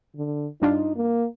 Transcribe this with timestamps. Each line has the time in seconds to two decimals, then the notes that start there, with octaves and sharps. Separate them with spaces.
0.16 D3
0.62 G2 D4 D#4 F4
0.96 A#3